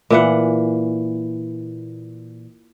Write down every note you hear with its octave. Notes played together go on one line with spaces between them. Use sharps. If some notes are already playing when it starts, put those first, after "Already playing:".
A#2 E3 F#5